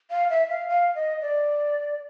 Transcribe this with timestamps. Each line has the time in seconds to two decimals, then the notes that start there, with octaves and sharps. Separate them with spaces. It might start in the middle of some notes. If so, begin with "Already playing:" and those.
0.11 F5
0.30 E5
0.50 F5
0.69 F5
0.95 D#5
1.22 D5